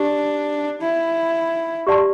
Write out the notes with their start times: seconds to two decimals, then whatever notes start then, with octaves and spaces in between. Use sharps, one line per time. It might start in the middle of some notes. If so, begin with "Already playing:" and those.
Already playing: D4 G4 D5
0.81 E4
1.87 G4 D5 A5 C6